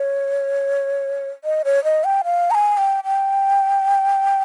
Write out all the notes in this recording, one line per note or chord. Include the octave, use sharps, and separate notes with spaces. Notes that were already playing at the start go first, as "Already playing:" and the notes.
Already playing: C#5
D#5
C#5
D#5
G5
F5
A#5
G#5
G5
G5